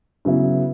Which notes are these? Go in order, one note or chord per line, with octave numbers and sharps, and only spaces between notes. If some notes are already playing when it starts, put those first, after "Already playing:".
C#3 F#3 B3 E4